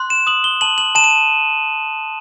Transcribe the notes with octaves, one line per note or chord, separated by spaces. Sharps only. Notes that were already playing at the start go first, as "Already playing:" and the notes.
Already playing: C6 F#6
E7
D#6 F#7
G7
A5 F#7
F#7
A5 E7
D#7